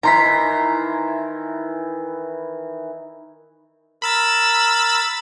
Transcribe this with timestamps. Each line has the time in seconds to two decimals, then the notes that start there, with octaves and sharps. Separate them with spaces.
0.03 D#3 E3 E4 A#5 C6 B6
4.02 A#4 B5 E6 A6